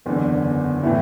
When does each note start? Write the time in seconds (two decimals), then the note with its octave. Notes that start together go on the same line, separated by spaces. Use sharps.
0.06 F#1 E2 D3 B3
0.82 A2 E3 A3 B3 E4